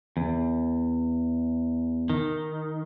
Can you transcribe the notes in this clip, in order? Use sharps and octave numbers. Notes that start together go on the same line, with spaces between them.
E2
D#3